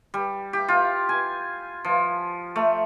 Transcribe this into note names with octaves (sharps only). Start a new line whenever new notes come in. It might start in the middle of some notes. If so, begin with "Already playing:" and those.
G3
G4
F4
G#5
F3
A3